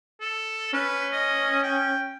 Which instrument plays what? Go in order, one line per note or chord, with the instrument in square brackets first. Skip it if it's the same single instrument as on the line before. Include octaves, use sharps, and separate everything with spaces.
[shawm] A4
[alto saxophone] C#4 [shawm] B4
[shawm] D#5
G5